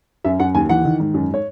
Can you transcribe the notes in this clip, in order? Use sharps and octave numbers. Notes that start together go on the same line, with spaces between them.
F#2 E5
F#2 F#5
D#2 G#5
E3 F#5
D#3
G#2
F#2
C#5